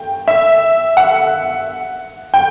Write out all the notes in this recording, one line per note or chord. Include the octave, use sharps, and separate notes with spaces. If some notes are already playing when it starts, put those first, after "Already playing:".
Already playing: G5
E5
F#5
G5